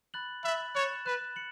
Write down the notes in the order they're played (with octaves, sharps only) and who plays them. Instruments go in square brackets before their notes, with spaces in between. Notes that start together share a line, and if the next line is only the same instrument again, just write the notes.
[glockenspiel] B5 F#6 A6 F#7
[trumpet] E5 [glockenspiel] B5 F#6 A6 F#7
[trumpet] C#5 [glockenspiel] F#6 A6 E7
[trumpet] B4 [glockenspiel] F#6 A6 E7
[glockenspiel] C#7 F#7